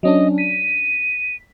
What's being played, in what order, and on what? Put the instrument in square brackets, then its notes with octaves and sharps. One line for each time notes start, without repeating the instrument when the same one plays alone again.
[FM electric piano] F#3 C#4 D4 [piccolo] D#5
[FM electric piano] B6 [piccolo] D#7